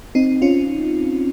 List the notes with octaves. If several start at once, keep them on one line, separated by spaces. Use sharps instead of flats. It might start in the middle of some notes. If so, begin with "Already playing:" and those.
C4 D#4
C#4 F4